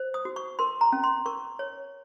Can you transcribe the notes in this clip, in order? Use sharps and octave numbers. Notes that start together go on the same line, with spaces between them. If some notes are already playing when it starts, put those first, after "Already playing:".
Already playing: C5
D#6
F#4
C#6
A#4 C6
A#5
C#4
C6
A#4 C#6
C#5